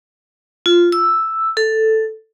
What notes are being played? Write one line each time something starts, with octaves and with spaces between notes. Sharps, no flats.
F4
E6
A4